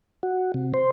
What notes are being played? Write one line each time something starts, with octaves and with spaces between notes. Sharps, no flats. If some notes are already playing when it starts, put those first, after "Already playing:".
F#4
C3
C5